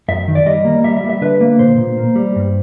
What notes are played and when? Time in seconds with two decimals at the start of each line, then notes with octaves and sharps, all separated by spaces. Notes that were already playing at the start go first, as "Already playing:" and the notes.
0.08 F#2 E5
0.28 D#3
0.35 D5
0.46 G3 D#5
0.65 A#3
0.84 G3 E5
0.97 E5
1.04 G3
1.10 E5
1.21 D3 B4
1.41 A#3
1.59 A#2 C5
1.78 A#2
1.98 A#3
2.16 G3
2.36 G2